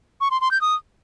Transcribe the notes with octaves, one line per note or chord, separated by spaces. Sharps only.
C#6
C6
C6
G6
D#6